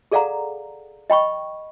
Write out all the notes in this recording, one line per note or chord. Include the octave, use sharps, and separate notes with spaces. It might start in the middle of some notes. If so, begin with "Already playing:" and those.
G#4 A4 D5 F5 F#5 A#5
D#5 G5 B5 C#6